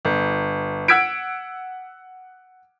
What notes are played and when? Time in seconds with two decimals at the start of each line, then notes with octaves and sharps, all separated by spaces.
0.05 G1
0.88 F#5 E6 G#6 B6 D7